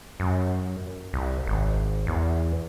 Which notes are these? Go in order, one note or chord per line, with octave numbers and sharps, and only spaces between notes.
F#2
C2
G#1
E2